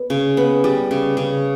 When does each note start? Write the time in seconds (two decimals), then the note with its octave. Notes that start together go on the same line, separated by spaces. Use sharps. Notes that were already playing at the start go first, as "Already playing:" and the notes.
Already playing: B3
0.10 C#3
0.37 B3
0.64 G3
0.91 C#3
1.17 C#3